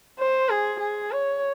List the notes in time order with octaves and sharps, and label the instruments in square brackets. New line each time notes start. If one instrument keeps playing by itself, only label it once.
[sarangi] C5
G#4
G#4
C#5